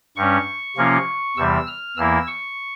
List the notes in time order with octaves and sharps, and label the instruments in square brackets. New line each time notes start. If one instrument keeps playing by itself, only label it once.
[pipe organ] G2 G3 C#4 C#6
C3 F3 A#3 C#4 F4
E2 C3 E3 G3 E6
F6
E2 E3 A#3 E4 E6
C#6